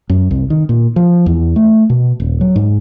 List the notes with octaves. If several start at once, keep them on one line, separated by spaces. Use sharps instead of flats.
F#2
C2
D#3
A#2
F3
E2
A3
B2
D#1
F#3
G#2